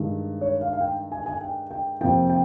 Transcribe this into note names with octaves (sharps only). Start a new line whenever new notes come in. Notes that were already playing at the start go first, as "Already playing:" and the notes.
Already playing: G2 D#3 G#3
C#5
F5
F5
G5
G#5
G#5
G5
G5
F2 C3 F3 A#3 G5
G5